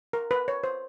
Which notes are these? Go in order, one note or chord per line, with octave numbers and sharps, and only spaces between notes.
A#4
B4
C#5
C5